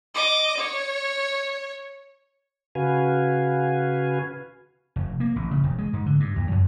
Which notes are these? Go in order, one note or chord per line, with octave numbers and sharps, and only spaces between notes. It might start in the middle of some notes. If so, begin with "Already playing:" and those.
D#5 D6
C#5
C#3 F#4 B4 F5 G#5
F1
A#3
A1
C#3
E1
G#3
G#2
D3
G2
D#2
F#2